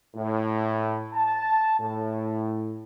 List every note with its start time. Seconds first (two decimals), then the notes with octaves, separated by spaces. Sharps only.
0.15 A2
1.13 A5
1.80 A2